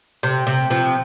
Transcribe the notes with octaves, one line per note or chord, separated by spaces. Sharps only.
C3
C3
C3 F3